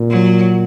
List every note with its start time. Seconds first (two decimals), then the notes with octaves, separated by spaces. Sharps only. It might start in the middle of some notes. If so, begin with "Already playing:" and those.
Already playing: A#2
0.09 F#3